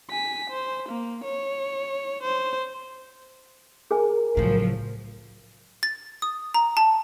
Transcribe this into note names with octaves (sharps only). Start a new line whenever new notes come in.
G#5 B6
C5
A#3
C#5
C5
G#4 A#4 G#5
A2 C#3 F3 F#3
A6
D#6
A#5
A5